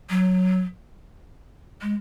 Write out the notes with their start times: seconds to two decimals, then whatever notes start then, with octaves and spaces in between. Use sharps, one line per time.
0.10 F#3
1.82 G#3